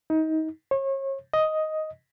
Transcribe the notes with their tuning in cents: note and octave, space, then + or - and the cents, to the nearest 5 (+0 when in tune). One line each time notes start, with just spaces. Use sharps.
D#4 +25
C#5 -35
D#5 +5